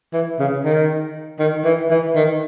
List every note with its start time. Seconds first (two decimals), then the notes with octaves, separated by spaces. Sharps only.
0.13 E3
0.39 C#3
0.64 D#3
1.39 D#3
1.65 E3
1.90 E3
2.15 D#3